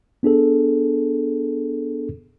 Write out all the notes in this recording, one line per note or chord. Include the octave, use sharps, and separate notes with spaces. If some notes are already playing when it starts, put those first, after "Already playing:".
B3 D4 G#4 A4